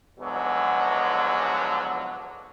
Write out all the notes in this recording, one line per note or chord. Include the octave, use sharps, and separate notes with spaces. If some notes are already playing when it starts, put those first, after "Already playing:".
E2 G#2 B2 D3 F3 F#3